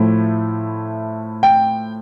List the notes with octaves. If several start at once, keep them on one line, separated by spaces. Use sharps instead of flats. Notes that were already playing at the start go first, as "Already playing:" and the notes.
Already playing: A2 F3 A3 E4
G5